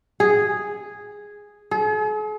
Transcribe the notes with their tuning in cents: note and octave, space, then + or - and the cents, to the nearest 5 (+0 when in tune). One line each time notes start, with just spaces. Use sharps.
G#4 -5
G#4 +45